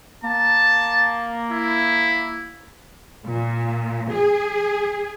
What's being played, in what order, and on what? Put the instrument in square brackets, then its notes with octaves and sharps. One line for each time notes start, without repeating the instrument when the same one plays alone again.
[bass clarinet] A#3 [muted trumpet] A5
[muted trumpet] E4
[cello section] A#2
G#4